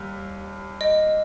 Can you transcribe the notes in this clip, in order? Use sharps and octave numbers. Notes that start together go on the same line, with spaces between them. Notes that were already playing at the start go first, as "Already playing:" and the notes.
Already playing: D#2 G3
D#5